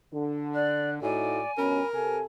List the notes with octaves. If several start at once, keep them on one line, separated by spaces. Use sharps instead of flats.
D3
D5 F#6
A2 A3 D#4 F#4 D5 G#5
G2 B2 C#4 A#4 B5
C3 A4 G#5